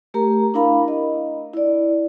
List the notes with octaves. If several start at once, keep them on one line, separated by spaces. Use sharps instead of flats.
A3 G4 A#4 A#5
D4 E4 A#4 F5 B5
D#5
E4 D5